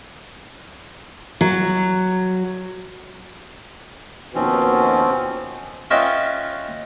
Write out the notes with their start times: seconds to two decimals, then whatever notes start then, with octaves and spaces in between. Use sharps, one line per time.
1.41 F#3
4.35 D#2 B2 F3 C4 C#4
5.91 C#4 F4 B4 D#5 E5 G5